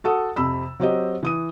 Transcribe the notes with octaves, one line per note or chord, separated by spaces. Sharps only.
F#4 A4 F#5 D#6
F2 C3 B5 E6
F#3 C4 G4 D#5
E3 D#6 D#7